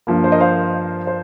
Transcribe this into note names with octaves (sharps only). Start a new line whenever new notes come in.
G2 F3 A#3
C5
A#4 D#5
C5 F5
C5